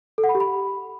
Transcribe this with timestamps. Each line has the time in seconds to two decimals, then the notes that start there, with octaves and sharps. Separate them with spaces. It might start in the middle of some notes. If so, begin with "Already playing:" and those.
0.18 A4
0.24 F#5
0.29 B5
0.35 G4
0.40 B5